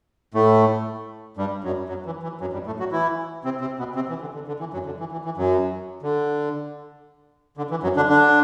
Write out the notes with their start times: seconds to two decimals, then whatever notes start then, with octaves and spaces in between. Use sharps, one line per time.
0.34 A2 A3
1.37 G2 G3
1.64 F#2 F#3
1.88 F#2 F#3
2.06 E3
2.23 E3
2.41 F#2 F#3
2.53 G2 G3
2.66 A2 A3
2.79 F#3 F#4
2.92 E3 E4
3.44 C3 C4
3.61 C3 C4
3.79 B2 B3
3.95 C3 C4
4.09 E3
4.21 D3
4.34 D3
4.48 D3
4.60 E3
4.73 F#2 F#3
4.86 D3
5.00 E3
5.12 E3
5.25 E3
5.37 F#2 F#3
6.02 D3
7.57 D3
7.71 E3
7.83 F#2 F#3
7.96 D3 D4
8.09 D3 D4